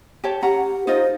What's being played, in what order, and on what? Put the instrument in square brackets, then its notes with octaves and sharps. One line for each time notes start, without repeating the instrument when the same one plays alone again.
[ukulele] G4 C#5 A5
[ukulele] C#4 F#5 A#5 [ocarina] G4
[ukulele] D#4 F4 D#5 [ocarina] C5